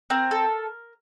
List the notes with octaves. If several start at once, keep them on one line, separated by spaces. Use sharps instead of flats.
C4 A#4
A4